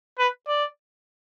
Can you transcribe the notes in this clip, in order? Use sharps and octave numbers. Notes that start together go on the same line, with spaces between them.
B4
D5